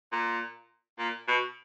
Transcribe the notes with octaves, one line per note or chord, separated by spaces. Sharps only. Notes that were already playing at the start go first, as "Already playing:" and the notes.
A#2
A#2
B2